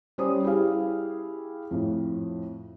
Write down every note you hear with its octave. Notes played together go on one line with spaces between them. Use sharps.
G3 C#4 C5 D5 D#6
E4 G4 G#4 F5
F2 A2